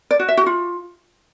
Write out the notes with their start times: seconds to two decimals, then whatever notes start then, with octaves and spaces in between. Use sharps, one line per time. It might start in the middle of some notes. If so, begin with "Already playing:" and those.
0.11 D5
0.20 F#4
0.28 E5
0.37 F#4
0.46 F4